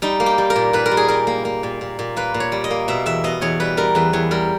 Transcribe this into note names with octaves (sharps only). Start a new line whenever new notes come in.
G3 D#4
A#3
G4
G3
A#4
A#2
A#2 B4
A#4
G3
G#4
G3 A#4
A#3
A#3
A#2
A#2
A#2
A#3 B4
A#2
C#5
G3
D#5
A#3
B2 E5
E2 E5
B2 D#5
E2 C#5
G3 B4
G3 A#4
E2 B4
E2 C#5
G3 A#4